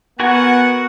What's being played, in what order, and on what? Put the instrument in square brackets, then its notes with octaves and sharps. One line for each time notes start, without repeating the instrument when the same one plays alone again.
[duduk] B3 [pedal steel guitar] F#4 A#4 G#5 [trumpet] F#5